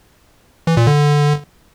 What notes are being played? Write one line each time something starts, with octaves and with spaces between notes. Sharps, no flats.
E3
A#2
D3